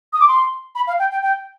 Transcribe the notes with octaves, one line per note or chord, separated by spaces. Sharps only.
D#6
D6
C6
B5
F5
G5
G5
G5